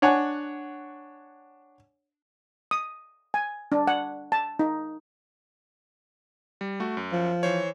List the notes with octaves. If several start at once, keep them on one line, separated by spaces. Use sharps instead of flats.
D4 C#5 F#5 G#5
D#6
G#5
D4
F#5
A5
D#4
G3
A3 F#4
F#2
F3
E3 C5 C#5